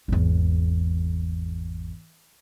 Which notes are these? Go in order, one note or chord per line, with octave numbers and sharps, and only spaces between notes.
G#1 E2